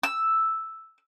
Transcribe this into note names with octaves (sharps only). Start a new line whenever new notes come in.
E6